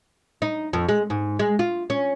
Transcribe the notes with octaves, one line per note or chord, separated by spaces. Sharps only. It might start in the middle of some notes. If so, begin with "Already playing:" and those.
D#4
F2
G#3
G#2
G#3
F4
C#4